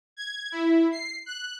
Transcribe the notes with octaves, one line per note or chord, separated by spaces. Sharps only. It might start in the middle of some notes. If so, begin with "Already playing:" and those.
G#6
E4
C7
F#6